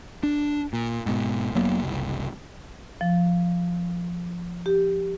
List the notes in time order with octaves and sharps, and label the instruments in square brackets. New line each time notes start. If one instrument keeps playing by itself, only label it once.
[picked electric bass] D4
A#2
G#2 B2
F1 F#3 A#3 B3
F#1 C2
[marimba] F3
G4